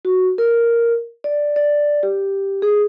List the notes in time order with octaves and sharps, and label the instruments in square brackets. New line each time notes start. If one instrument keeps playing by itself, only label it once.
[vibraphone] F#4
A#4
D5
D5
G4
G#4